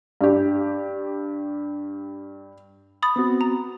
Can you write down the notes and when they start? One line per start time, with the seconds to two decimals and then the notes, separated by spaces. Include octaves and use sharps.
0.21 G2 G4
3.02 B5 D#6 A6
3.16 B3 C4 F#4
3.41 A#5